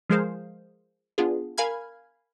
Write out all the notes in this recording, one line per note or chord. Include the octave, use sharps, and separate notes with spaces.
F3 G#3 G#4 A#4 C5 F5
B3 D4 F4 G#4
A#4 F5 G#5 B5 F6 G#6